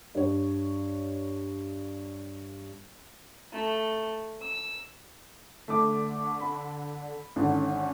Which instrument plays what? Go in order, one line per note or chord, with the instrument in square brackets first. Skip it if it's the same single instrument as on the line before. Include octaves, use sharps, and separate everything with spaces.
[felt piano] G2 C#5
[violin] A3 A4
E6
[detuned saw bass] D3 [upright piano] A3 D6
[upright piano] B5
[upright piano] G#1 D3 [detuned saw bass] C#4